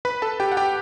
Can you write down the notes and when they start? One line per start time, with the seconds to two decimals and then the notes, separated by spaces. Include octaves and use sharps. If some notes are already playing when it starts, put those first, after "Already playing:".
0.05 B4 B5
0.22 A4 A5
0.40 G4 G5
0.52 F#5
0.57 G4 G5